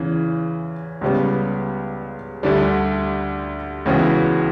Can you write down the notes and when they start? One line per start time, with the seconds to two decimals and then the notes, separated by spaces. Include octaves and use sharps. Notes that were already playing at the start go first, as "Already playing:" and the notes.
Already playing: E2 C#3 E3
1.01 C#2 C#3 G3 B3
2.43 D2 D3 G3
3.86 C#2 C#3 E3 B3 F#4